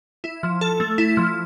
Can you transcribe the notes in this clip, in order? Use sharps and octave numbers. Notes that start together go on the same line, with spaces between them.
E4
F3
A4
A3
E4
F3